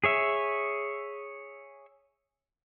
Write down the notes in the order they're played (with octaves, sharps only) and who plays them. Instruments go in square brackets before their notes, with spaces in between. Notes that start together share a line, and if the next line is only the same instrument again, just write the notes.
[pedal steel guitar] G#4 C#5 E5